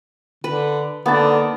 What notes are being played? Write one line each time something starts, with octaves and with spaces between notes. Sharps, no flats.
D3 B4
D3 A#3 B3 D#4 A5